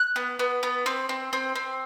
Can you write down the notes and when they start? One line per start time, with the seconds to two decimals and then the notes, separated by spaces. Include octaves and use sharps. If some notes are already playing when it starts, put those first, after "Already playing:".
Already playing: F#6
0.16 B3
0.39 B3
0.63 B3
0.86 C4
1.09 C4
1.33 C4
1.55 C4